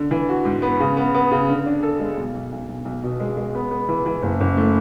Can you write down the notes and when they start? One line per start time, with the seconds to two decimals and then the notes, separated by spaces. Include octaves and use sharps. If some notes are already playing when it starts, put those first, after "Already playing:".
Already playing: D3
0.11 E3
0.29 F#4
0.45 G#2
0.62 B3
0.80 C#3
0.97 B3
1.15 B3
1.31 C#3
1.49 D3
1.66 D4
1.83 A4
1.99 G#3
2.17 B1
2.34 B1
2.52 B1
2.69 B1
2.85 B1
3.03 B2
3.20 G#3
3.37 G#3
3.55 B3
3.71 B3
3.89 E3
4.06 E3
4.23 F#1
4.41 F#1
4.57 A3